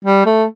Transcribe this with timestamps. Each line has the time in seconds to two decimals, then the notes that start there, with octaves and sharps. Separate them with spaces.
0.05 G3
0.26 A3